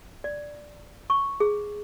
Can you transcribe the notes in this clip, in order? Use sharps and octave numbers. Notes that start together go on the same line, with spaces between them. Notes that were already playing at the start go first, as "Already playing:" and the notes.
D5
C#6
G#4